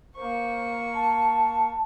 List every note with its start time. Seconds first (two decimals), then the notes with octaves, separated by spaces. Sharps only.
0.16 A#3 C5 C#6
0.94 A5